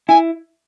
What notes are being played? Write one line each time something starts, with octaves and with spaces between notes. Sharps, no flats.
E4 G#5